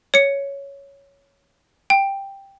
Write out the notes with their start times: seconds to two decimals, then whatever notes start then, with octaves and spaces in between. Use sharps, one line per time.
0.14 C#5 C#7
1.90 G5